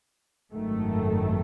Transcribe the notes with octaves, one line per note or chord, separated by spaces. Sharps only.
G#1 F#2 D#3 A3